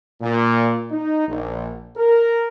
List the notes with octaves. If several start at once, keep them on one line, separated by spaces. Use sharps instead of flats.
A#2
D#4
A#1
A#4